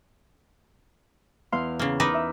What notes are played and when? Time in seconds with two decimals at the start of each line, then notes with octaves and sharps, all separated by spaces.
1.52 E2 F5 C6
1.79 C#3 A#3
2.00 D#4 A#4 B4 D6
2.14 E5